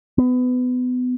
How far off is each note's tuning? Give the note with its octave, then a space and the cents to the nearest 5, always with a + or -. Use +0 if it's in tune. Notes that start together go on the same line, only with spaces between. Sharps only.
B3 +25